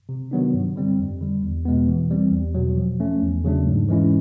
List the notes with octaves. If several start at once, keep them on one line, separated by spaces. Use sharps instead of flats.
C3
D#3 F#3 B3 D4
G2
D3 G3 C4
F2
D3 G3
E2
B2 G#3 B3
E3
G3 C4
E2
B2 F#3
F3
A3 C#4
E2
C#3 F#3 A3 D4
G#2
E3 G#3 C#4 E4